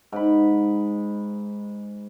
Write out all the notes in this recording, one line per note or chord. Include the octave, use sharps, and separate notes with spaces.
G#2 B5